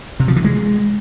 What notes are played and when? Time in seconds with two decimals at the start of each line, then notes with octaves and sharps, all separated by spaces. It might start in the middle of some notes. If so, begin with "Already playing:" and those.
0.20 C3
0.28 F3
0.36 E3
0.44 G#3